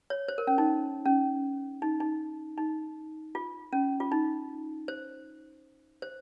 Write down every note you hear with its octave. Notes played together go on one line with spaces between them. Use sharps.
C#5
C5
A#4
C#4
D#4
C#4
D#4
D#4
D#4
F4
C#4
F4
D#4
C5
C5